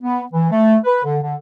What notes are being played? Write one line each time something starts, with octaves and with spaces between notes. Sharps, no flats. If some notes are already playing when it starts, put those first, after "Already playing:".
B3
E3
A3
B4
D3
D3